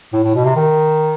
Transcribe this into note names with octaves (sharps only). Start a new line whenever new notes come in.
A2
A2
B2
C3
D#3